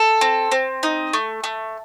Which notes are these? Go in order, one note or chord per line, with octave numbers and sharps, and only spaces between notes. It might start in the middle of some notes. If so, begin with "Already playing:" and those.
Already playing: A4
C4
C4
D#4
A3
A3